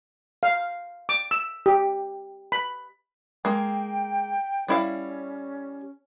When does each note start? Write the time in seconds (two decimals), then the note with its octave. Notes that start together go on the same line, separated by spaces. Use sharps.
0.43 F5
1.09 D6
1.31 E6
1.66 G4
2.52 B5
3.45 G#3 A#3 G5
4.68 G3 C#4 E4 F5